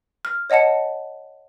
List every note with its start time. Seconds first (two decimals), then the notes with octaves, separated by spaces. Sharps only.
0.25 F6
0.50 C#5 D#5 F#5 A5 C#7